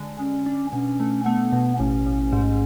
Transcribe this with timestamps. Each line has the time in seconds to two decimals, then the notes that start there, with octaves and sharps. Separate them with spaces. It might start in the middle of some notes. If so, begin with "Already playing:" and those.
Already playing: D3 G#3
0.19 G#3 C#4
0.46 D4
0.73 B2 C#4
1.00 A3
1.26 A3 B3
1.53 B2
1.79 A1 C#4
2.06 A1
2.33 G#2